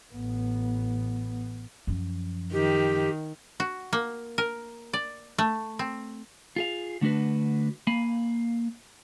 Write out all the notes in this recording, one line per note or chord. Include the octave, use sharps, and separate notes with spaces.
A1 B3
F#2 F3
D#3 G4
F#4
A#3
A#4
D5
A3
C4
F4 G#4 F5
D3 A3 D4 F#4 B4
A#3 F5 G#5 B5